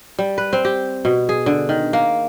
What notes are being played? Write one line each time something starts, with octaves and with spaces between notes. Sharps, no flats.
G3
B4
C4
G4
B2
G#4
D3
D#3
A#3